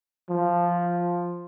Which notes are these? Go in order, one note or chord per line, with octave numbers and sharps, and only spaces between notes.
F3